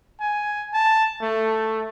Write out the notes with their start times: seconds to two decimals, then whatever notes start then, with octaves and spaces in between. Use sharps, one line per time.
0.20 G#5
0.73 A5
1.22 A3